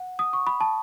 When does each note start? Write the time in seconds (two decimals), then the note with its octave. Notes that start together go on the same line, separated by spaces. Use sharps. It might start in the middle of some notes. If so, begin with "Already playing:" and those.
Already playing: F#5
0.19 D#6
0.33 C#6
0.47 B5
0.60 A5